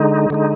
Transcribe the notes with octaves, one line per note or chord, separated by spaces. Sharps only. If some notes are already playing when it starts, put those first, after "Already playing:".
Already playing: D3 G#3 D#4
D3 G#3 D#4